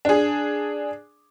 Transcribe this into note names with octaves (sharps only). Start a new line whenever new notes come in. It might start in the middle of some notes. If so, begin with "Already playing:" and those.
D4 G#4